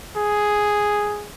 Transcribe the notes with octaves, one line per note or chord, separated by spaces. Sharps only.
G#4